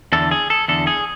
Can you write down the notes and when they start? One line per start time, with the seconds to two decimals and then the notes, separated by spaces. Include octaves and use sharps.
0.12 E2 D3 A4
0.31 G#4
0.50 A4
0.68 E2 D3 A4
0.87 G#4